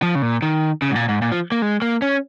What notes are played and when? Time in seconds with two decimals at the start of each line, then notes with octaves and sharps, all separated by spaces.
0.02 F3
0.15 C#3
0.22 A#2
0.42 D#3
0.82 C#3
0.91 G#2
0.96 A#2
1.09 G#2
1.22 A#2
1.32 F3
1.52 A#3
1.62 G#3
1.82 A#3
2.02 C#4